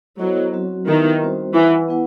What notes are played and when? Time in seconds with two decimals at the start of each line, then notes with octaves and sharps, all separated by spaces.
0.19 F#3 B3 E4 A4 C5 D#5
0.53 F#3 C4 F#4
0.87 D#3 B3 E4 G4 B4 E5
1.21 G3 C4 F#4 C5
1.54 E3 E4 B4 F#5
1.88 B3 E4 B4 F#5